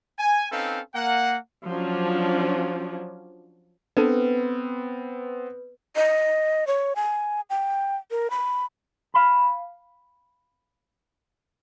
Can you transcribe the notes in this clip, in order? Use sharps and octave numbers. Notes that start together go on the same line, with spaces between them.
G#5
C4 C#4 D#4 A4 B4 F5
A#3 F#5
F3 F#3 C#4 D4
B3 C4 D4 A4 B4
D#5
C#5
G#5
G5
A#4
B5
F5 B5